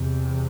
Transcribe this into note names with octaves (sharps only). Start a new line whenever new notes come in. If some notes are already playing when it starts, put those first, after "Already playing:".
Already playing: E2 C3